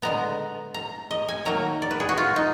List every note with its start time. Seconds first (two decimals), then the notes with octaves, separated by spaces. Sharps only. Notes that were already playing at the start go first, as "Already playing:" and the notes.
0.02 D3 G#3 B3 A#5
0.74 A#5
1.11 D#5
1.28 G#5
1.45 D#3 F#3 A#3 A#5
1.82 D5
1.91 B4
2.00 G#4
2.09 F#4
2.17 F4
2.36 D#4